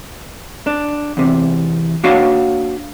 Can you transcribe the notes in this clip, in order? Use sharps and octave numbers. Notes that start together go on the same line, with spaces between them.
D4
E2 C3
A#3 D4 F#4 C#5 F5